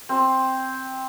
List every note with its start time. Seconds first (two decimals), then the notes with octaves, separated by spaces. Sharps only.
0.09 C4